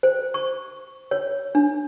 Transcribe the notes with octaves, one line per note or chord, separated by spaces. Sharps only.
C5
C#6
C#5
D4